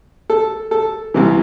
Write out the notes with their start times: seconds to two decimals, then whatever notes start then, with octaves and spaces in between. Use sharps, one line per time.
0.30 A4
0.71 A4
1.14 C2 C3 E3